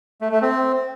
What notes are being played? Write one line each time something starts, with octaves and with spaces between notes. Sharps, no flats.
A3
A3
C4